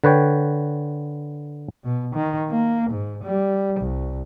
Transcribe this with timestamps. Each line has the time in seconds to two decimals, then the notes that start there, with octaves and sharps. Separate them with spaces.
0.04 D3 B4 C#5 G5
1.84 B2
2.15 D#3
2.50 A#3
2.90 G#2
3.24 G3
3.80 C2